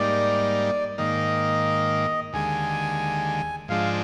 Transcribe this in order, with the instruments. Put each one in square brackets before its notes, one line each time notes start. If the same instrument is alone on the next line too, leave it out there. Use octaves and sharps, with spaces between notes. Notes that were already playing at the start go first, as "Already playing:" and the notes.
Already playing: [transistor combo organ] G#2 G3 A#3 D#4 [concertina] D5
[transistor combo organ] G#2 D#3 A#3 [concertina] D#5
[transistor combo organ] D#2 D3 G#3 [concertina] G#5
[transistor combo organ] G#2 F3 G#3 D4 [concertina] F5